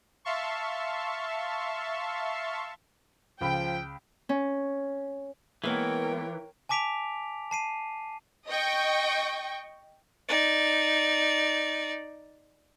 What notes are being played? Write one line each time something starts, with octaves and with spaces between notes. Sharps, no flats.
E5 F5 A5 C6 C#6
C#2 F3 G5 B5
C#4
E3 G#3 A#3 B3 A#4 C#5 G5
G#5 A5 D6 B6 D7 F7
A5 C7 D#7
D#5 G5 C#6
D#4 D5